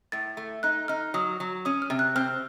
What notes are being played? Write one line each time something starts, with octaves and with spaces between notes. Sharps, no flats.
A2 A6
A3
D#4 F#6
D#4 F6
F#3 D#6
F#3
C#4 D#6
F6
C3
F#6
C4 F6